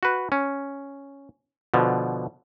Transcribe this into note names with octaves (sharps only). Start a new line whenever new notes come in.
F#4 B4
C#4
B2 D3 F3